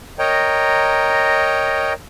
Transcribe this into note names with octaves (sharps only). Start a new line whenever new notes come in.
A#4 C#5 D#5 G5 A#5